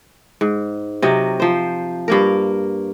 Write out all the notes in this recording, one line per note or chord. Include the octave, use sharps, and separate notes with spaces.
G#2
C3 F#3 D#5
F3 C5
G2 A#3 A#4